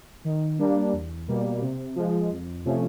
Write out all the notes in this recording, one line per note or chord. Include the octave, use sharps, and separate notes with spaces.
D#3
G3 A#3 D4
E2
B2 G3 A#3
C3
F3 G#3
F2
C3 F3 A3 C#4